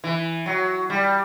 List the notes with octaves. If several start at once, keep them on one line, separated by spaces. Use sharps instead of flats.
E3
F#3
G3